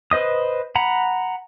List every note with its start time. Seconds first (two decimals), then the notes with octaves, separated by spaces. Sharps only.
0.11 B4 C5 D#5 D#6
0.76 F#5 A#5 B5